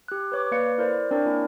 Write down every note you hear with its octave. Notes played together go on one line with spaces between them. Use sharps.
G4 F#6
B4 C#5 D6
A#3 B4 D5 F5 C#7
E4 A#4 C5 D5
C4 D4 A#4 C#5 D5
A#3 E4 G#5